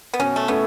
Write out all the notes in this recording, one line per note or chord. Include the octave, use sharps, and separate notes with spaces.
B3
B2 C#4
A3
A3 B3 C#4 E4 A4